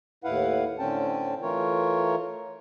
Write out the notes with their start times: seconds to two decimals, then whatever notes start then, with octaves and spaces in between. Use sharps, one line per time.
0.24 D#2 A2 E4 B4 F5 F#5
0.79 A2 D3 C4 C#4 G5 A5
1.42 E3 A3 F4 A#4 C#5